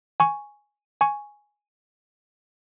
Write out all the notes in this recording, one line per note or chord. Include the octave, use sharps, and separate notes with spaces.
G#5 C#6
G#5 C#6